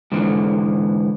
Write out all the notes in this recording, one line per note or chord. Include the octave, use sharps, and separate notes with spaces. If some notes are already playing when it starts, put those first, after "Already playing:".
G#2 D3 E3 F3